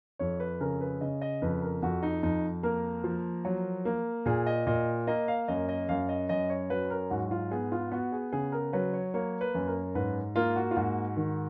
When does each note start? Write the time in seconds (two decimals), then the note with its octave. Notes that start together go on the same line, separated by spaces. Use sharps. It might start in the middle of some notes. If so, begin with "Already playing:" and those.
0.19 F2 C#5
0.40 B4
0.60 C#3 A#4
0.81 B4
1.01 C#3 D#5
1.21 D#5
1.42 F2 B4
1.62 A#4
1.82 F2 F#4
2.03 D#4
2.23 F2 D#4
2.63 A#3 A#4
3.04 F3
3.45 F#3
3.85 A#3
4.26 A#2 G#4
4.46 D#5
4.67 A#2 D#5
5.07 A#3 D#5
5.28 F5
5.48 F#2 D#5
5.69 D#5
5.89 F#2 F5
6.09 D#5
6.29 F#2 D#5
6.49 C#5
6.70 F#3 B4
6.90 A#4
7.10 G#2 F#4
7.26 F#4
7.31 F4
7.51 B3 G#4
7.72 F4
7.91 B3 F#4
8.12 G#4
8.32 C#3 G#4
8.52 A#4
8.73 F#3 B4
8.93 C#5
9.14 A#3 C#5
9.41 B4
9.55 F#2
9.67 A#4
9.95 G#2 B4
10.36 A#3 F4
10.56 F#4
10.71 F4
10.76 G#2 F#4
11.16 D#3